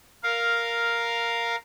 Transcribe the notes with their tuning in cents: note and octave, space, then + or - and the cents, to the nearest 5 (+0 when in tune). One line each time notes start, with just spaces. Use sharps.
A#4 +0 F5 +0